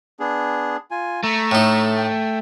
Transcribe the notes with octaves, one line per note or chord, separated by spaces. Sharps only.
B3 D4 G#4
F4 G#5
A3 A#5 C#6 E6
A2 D#4
G5